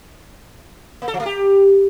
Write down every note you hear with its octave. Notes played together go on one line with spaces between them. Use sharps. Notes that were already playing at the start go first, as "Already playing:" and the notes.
A#3
A4
F3
A3
G4